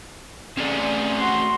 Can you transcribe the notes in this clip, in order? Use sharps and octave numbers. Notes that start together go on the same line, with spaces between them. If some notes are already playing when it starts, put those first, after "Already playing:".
A3 C4 C#4 G#4 D5
F#4 C6